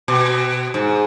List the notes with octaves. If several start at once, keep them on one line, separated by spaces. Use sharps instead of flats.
B2
G#2